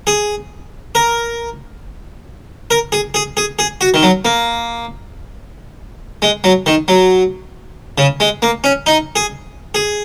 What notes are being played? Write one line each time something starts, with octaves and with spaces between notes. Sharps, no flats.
G#4
A#4
A#4
G#4
G#4
G#4
G#4
F#4
D#3
F#3
A#3
G#3
F#3
D#3
F#3
C#3
G#3
A#3
C#4
D#4
G#4
G#4